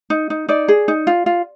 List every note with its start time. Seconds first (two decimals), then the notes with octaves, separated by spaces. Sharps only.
0.10 D#4
0.30 D#4
0.49 D#4 D5
0.68 G#4
0.88 D#4
1.07 F4
1.26 F4